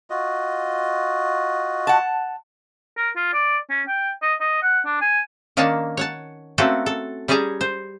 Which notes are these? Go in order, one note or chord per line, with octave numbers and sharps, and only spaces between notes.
F4 F#4 D#5
F#5 A5
A#4
F4
D5
C#4
G5
D#5
D#5
F#5
D4
G#5
D#3 A#3 C#4 D4 C#5 A5
C#5 F#5 A5
A3 A#3 C4 C#4 F#4 A4
A4
G3 C#4 G#4 A5 A#5
C5